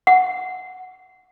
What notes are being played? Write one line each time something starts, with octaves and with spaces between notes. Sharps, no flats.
F#5